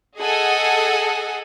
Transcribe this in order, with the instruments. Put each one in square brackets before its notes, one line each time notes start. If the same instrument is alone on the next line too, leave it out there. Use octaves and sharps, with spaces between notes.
[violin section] G#4 A4 D#5 F#5 G#5